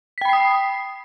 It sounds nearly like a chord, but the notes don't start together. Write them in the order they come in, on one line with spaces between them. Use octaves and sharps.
B6 G5 B5 C7 D#6